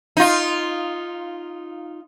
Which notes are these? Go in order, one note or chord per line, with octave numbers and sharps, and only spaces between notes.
D#4 F4